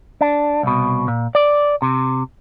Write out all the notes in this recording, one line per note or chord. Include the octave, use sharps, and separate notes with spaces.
D4
C2 B2
A#2
D5
C3